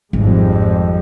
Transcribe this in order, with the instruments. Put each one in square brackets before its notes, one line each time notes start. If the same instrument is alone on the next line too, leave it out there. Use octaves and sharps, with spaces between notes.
[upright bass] G#1 [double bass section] F2 G3 G#3